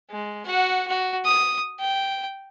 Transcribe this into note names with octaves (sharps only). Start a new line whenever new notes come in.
G#3
F#4 F#5
F#4
D#6
G5